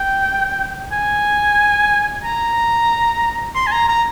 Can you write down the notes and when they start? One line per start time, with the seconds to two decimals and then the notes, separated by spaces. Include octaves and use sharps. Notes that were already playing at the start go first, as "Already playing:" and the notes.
Already playing: G5
0.92 G#5
2.24 A#5
3.55 C6
3.67 G#5
3.72 A#5
3.89 A#5